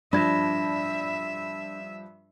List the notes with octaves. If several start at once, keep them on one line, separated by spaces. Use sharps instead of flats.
G2 F3 D4 E5 B5 G#6 A#6 E7